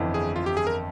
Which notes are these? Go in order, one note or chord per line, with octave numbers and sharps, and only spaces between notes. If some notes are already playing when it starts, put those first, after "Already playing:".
Already playing: G1 F2 E3
G#4
F4
G4
G#4
A#4